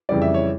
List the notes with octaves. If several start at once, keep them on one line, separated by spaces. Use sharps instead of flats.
F2 C#3 E3 G3 D5
E5
C#5